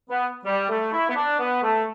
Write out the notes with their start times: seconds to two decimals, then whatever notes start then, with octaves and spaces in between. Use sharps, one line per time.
0.10 B3
0.45 G3
0.69 A3
0.93 E4
1.09 B3
1.16 D4
1.40 B3
1.63 A3